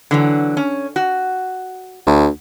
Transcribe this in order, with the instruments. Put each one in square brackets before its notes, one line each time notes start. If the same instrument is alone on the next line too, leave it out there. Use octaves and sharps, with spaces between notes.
[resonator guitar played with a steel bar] D3 E3 F#3
C#4
F#4
[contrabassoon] D2